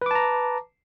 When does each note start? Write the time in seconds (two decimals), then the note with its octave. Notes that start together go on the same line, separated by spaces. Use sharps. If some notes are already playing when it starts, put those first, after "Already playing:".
0.02 B4
0.06 D6
0.11 A5
0.15 A#5